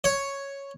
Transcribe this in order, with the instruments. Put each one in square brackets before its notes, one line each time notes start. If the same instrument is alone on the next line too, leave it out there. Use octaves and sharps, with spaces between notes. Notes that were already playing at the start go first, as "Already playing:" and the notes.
[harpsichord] C#5